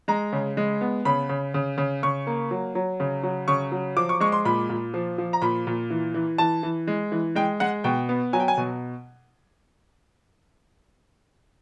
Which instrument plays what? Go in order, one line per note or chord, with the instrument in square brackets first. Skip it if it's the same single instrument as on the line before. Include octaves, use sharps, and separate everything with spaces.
[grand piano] G#3 A#5
C#3
G#3
B3
C#3 B5
C#3
C#3
C#3
C#3 C#6
A#3
F#3
F#3
C#3
F#3
C#3 C#6
F#3
F3 D6
C#6
G#3 C#6
C6
A#2 B5
A#2
F3
F3
A#5
A#2 B5
A#2
E3
E3
E3 A5
E3
G#3
E3
G#3 G5
G#3 F#5
B2 G5
B3
F#3 G#5
G5
G#5
B2